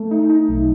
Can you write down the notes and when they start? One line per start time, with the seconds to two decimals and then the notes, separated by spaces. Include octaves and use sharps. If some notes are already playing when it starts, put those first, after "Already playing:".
Already playing: A3
0.11 D#4
0.29 D#4
0.49 B1